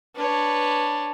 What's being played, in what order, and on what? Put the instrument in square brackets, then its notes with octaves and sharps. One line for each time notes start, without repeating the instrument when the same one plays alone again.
[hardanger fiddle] D4 [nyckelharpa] B4 C#5